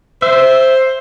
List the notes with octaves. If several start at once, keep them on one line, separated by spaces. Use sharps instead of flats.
C5 E5